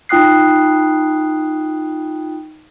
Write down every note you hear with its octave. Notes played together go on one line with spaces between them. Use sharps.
D#4 F4 G5 D#6 F#6 C7